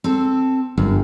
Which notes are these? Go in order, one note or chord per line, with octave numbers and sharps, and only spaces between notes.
C4 A4
G1 F#2